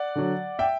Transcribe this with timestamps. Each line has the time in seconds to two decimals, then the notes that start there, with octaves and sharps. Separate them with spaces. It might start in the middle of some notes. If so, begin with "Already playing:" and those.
Already playing: D5 F#5
0.15 D3 F#3
0.59 E5 G5